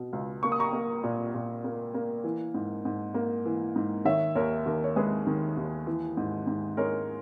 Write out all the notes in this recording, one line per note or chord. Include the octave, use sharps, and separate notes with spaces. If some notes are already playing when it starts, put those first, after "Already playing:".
Already playing: B2
C#2
A#3 C#6
D#6
A#5 C#6
A#3
A#2
A#2
A#3
A#3
E3
G#2
G#2
A#3
E3
G#2
D#3 C#5 E5
D#2 A#4 C#5
D#2 A#4
C#5
G#3 G#4 B4
D#3
D#2
E3
G#2
G#2
G#3 A#4 C#5